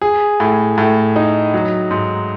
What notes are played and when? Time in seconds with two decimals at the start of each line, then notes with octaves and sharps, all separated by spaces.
0.01 G#4
0.40 A2
0.78 A2
1.16 D#4
1.54 F#3
1.91 G#2